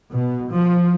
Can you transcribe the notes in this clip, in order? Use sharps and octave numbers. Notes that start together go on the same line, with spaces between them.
B2
F3